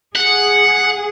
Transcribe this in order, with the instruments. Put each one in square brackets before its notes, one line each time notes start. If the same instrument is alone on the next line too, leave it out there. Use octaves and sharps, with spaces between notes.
[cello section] G#4 [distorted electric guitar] F#5